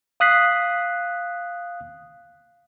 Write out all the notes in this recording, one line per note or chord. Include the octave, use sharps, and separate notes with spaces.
F5 D#6 F#6 B6 C7